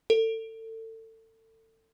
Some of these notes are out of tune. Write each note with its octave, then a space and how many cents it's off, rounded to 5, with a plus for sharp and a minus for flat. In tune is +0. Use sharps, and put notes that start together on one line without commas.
A4 +30